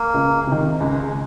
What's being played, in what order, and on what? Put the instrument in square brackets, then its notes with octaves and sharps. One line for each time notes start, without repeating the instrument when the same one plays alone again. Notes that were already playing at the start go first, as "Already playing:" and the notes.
Already playing: [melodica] A#3
[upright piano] C#2
C3 D#3
[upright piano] C#2 [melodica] G#3
[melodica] G#3